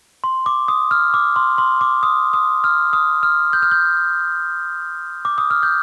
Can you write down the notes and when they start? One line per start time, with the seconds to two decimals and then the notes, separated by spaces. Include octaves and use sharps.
0.24 C6
0.46 D6
0.68 D#6
0.91 F6
1.14 D6
1.36 C6
1.58 C6
1.81 D6
2.03 D#6
2.33 D#6
2.64 F6
2.93 D#6
3.23 F6
3.53 G6
3.62 F6
3.71 G6
5.25 D6
5.38 D#6
5.50 F6
5.63 G6